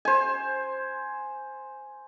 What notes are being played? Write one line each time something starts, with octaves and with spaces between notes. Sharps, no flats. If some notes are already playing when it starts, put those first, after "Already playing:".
C5 G#5